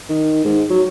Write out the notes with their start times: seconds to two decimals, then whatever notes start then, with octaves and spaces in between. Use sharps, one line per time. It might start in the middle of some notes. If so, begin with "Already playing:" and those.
0.09 D#3
0.44 G#2
0.70 F#3